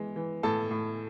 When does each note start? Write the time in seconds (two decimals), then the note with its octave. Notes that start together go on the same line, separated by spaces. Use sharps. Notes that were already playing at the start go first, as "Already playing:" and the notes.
Already playing: E3 G#3
0.16 E3
0.43 A2 A4 A5
0.71 A2